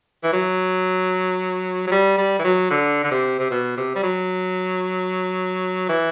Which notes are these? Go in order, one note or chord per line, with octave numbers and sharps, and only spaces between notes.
E3
F#3
F#3
G3
G3
E3
F#3
D3
D3
C3
C3
B2
C3
G3
F#3
E3